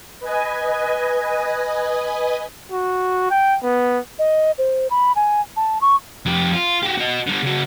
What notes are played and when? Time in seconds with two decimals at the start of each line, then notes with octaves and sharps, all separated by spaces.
0.20 B4 D#5 G#5
2.71 F#4
3.30 G5
3.63 B3
4.19 D#5
4.58 C5
4.90 B5
5.16 G#5
5.57 A5
5.81 C#6
6.26 F2 G4
6.53 F4
6.83 F#4 G4
6.98 F#4 D#5
7.27 D3 G3
7.43 C#3 F#4